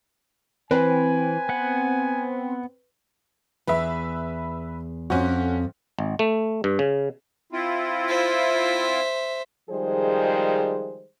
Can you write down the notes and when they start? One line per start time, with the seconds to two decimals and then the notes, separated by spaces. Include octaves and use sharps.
0.71 E3 C4 B4 G#5
1.49 B3 F#5
3.67 E2 G#4 B4 E5
5.10 F2 C#4 F#4
5.99 G#1
6.19 A3
6.64 G2
6.79 C#3
7.52 C4 E4 F4
8.09 C5 E5
9.70 D#3 F3 G3 G#3 G#4 C5